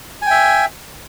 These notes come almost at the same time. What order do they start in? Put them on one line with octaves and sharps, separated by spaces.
G#5 G5 E5